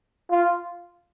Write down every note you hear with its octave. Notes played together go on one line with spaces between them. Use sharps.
F4